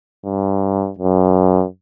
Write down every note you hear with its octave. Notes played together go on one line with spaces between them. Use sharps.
G2
F#2